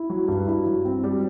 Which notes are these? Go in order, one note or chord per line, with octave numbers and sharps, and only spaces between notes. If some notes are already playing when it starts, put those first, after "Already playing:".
Already playing: E4
F#3
G2
E4
F#3
C4
G3